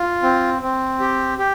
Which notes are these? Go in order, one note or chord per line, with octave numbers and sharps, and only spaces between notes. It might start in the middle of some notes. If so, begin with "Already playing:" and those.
Already playing: F4
C4
C4
G4
G4